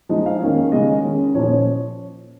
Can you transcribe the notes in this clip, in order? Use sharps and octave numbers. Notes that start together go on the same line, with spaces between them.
F3 G#3 D#4 D#5
F5
D#3 A#3 C#4
C#3 G#3 C#4 D#5
D#3 C#4
A#2 F3 C#4 C#5